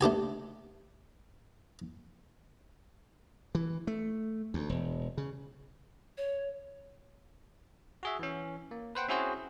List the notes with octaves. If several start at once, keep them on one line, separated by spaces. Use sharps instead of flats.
A3 D4 G4 G#5
E3
A3
D2
E1
C#3
C#5
F#4 G#4 E5
E3 C#4
A#3
B4 C5 F#5 G5
C4 C#4 E4 F#4 G#4 C5